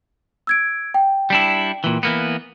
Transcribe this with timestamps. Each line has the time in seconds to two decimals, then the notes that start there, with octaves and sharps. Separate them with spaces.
0.47 E6 G#6 D7
0.94 G5
1.30 G3 D4 E4
1.84 A#2 E3
2.03 E3 A#3 B3